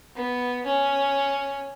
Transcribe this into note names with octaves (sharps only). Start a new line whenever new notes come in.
B3
C#4